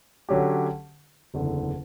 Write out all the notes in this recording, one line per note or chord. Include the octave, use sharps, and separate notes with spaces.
D3 F#3 C#4 G4
F#1 E2 D3